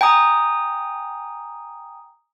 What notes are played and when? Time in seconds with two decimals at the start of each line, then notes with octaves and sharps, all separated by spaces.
0.01 G5 G#5 A#5 D#6